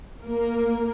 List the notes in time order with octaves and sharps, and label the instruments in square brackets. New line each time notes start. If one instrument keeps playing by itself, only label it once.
[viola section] A#3 A#4